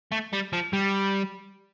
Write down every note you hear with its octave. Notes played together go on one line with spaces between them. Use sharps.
A3
G3
F3
G3